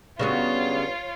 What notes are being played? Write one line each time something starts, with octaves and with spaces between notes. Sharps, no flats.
G2 C#3 F#3 B3 F4 C#5